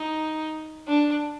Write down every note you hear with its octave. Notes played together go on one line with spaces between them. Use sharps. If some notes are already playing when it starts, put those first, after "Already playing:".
Already playing: D#4
D4